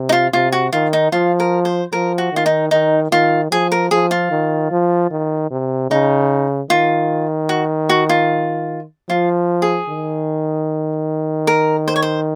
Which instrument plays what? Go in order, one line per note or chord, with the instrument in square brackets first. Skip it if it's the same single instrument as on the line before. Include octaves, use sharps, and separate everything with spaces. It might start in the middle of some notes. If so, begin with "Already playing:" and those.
Already playing: [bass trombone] C3
[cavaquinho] D#4
F4
[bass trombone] C3 [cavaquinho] F4
[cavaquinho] F#4
[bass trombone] D#3 [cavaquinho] F4
[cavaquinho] D#4
[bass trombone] F3 [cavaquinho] F4
[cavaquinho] A#4
C5
[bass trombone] F3 [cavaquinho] A#4
[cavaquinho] F#4
[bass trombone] D#3 [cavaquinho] F4
[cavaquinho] D#4
[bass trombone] D#3 [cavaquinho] D#4
[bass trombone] D#3 [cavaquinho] F4
[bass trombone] F3 [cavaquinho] G#4
[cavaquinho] A#4
[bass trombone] F3 [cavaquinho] G#4
[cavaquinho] F4
[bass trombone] D#3
F3
D#3
C3
[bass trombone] C#3 [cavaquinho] D#4
[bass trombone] D#3 [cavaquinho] F4
[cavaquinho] F#4
F#4
F4
[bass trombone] F3 [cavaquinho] F4
[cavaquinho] G#4
[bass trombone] D#3
[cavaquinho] A#4
C5
C#5
C5